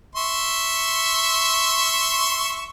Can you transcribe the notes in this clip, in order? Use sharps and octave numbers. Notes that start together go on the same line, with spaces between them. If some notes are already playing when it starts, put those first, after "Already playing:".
E5 C6 C#6